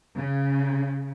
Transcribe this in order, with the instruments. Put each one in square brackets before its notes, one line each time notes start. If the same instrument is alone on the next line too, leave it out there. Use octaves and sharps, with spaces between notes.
[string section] C#3